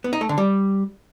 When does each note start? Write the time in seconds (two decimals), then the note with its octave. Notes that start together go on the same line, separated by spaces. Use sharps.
0.04 B3
0.13 D#4
0.21 A3
0.29 D3
0.38 G3